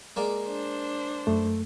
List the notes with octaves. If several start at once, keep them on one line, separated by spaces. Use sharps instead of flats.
G#3 A#3 D5
D4 C5
F#2 A3